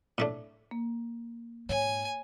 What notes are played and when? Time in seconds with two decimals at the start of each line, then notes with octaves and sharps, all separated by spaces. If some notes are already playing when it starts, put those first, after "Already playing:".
0.18 A2 A3 D4
0.71 A#3
1.69 G#2 C#5 G#5